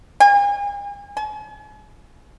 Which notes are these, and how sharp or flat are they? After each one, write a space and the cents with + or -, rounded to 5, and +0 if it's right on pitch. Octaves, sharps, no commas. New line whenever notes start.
G#5 -45
G#5 +45